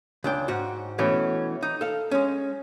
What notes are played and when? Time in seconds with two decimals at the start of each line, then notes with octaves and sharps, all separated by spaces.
0.24 C#2 D4 G5
0.48 G#2 F#4
0.99 B2 E3 A3 C#4
1.63 D#4
1.81 A4 F5
2.11 G#3 C#4